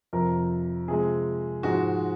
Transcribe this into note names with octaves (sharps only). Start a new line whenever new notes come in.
F2 C3 F3 A#4
C3 F3 G#3 G#4
G#2 F3 G#3 F#4